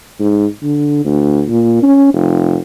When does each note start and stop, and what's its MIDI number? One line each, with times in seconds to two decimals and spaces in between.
0.19 0.45 44
0.63 1.02 50
1.05 1.42 38
1.48 1.81 46
1.83 2.13 61
2.13 2.57 29